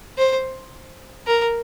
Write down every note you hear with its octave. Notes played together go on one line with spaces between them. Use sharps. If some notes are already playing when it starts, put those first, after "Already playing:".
C5
A#4